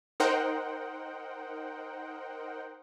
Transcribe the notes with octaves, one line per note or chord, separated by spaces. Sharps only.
D#4 A#4 C5 F#5 G5